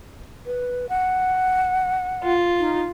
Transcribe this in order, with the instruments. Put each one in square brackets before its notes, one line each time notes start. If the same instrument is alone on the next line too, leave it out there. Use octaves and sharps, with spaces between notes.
[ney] B4
F#5
[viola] F4
[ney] D#4